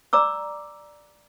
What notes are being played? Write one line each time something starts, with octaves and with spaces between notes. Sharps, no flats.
D5 A#5 D6 E6